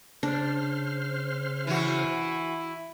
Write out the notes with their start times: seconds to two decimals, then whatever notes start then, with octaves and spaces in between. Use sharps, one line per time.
0.23 C#3 D4 C5 F6
1.67 E3 E4 F#4